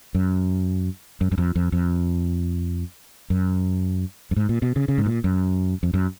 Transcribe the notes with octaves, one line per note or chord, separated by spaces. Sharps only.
F#2
F#2
F#2
F2
F2
F2
F#2
F#2
G#2
A#2
B2
C#3
C#3
G#2
A#2
F#2
F2
F#2